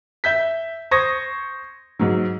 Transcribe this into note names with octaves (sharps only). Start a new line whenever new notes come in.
E5 G6 B6
C5 C#6 D#6 G#6 A#6
G#2 F#3